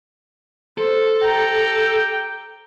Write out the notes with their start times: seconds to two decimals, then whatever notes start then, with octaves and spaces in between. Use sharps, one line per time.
0.78 A4 C5
1.22 G4 G5 A#5